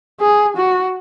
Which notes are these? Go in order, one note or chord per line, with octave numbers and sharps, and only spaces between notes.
G#4
F#4